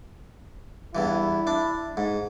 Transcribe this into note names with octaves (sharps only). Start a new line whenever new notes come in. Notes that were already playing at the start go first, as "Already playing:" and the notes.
E2 G2 E3 E4
D4
G#2